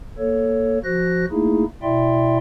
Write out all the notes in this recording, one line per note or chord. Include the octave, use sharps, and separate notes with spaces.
A#3 A4 C#5
F3 F#4 C5 F#6 A#6
A3 A#3 D#4 E4 G#4
B2 E4 D5 E5 G5 C6